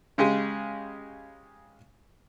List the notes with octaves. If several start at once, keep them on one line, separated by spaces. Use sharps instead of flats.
C#3 G#3 G4 G#4